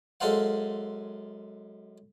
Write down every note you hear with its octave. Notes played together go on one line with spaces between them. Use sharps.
F#2 G#3 A4 C5 F5 F#5